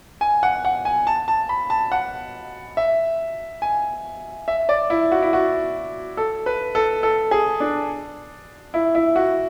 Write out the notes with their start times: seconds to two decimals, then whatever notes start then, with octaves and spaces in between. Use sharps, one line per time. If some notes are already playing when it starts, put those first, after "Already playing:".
0.21 G#5
0.43 F#5
0.65 F#5
0.85 G#5
1.07 A5
1.28 A5
1.49 B5
1.70 A5
1.92 F#5
2.77 E5
3.62 G#5
4.48 E5
4.69 D5
4.90 E4
5.12 F#4
5.22 E4
5.33 F#4
6.17 A4
6.46 B4
6.75 A4
7.03 A4
7.31 G#4
7.60 D4
8.74 E4
8.95 E4
9.16 F#4